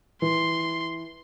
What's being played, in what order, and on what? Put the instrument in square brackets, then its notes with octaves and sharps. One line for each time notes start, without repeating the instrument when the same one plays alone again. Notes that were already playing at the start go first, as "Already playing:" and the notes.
[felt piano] E3 [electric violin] C6